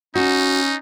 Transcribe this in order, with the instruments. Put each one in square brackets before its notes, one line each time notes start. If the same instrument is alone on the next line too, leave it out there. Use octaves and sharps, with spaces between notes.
[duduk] C#4 [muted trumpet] D#4 [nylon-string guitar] F#4